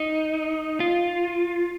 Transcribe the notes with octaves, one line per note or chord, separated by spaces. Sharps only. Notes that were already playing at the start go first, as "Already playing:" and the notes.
Already playing: D#4
F4